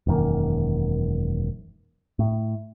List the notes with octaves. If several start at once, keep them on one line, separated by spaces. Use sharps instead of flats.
E1 F#2 D#3 A#3
A2